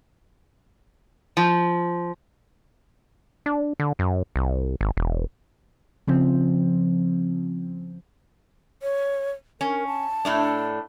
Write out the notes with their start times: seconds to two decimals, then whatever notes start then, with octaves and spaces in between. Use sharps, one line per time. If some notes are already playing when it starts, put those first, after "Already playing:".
1.37 F3
3.46 D4
3.80 D3
3.99 F#2
4.36 C2
4.81 G#1
4.97 E1
6.07 C#3 F3 C4
8.82 C#5
9.61 C#4 A#4
9.87 A5
10.25 A2 A3 D4